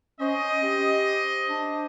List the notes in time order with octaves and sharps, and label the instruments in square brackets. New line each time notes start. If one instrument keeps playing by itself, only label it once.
[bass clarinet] C#4 [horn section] C5 D#5
[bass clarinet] G4
D4